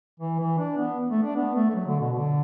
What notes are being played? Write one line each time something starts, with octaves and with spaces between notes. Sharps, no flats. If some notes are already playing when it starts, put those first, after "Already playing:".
E3
E3
D4
B3
A3
D4
B3
A3
A3
F#3
D3
B2
D3